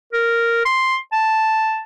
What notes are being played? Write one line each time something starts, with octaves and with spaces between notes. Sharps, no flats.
A#4
C6
A5